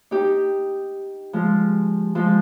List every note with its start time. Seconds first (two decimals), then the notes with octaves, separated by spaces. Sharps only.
0.11 D#4 G4
1.33 F3 G#3
2.15 F3 G#3